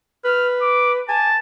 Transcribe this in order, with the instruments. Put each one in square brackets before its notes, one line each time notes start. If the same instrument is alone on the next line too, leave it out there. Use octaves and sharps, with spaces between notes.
[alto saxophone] B4 [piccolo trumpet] F6
[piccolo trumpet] D6
[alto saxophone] G#5 [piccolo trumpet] A5